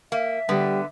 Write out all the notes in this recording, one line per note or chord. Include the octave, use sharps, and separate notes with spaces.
A#3 E5
D3 G3 B3